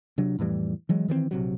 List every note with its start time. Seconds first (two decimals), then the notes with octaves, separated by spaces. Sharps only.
0.18 C3 F#3 D4
0.39 F2 A2 E3 G3
0.89 E3 F#3 G#3
1.08 D#3 E3 G3 C4
1.31 A#1 C3 F#3